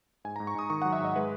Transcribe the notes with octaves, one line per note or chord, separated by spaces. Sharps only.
G#2 G#5
A#5
G#2
C#6
G#2 D#6
D#3 C#6
F#5
F#3
E5
G#2 D#5
G#3 B4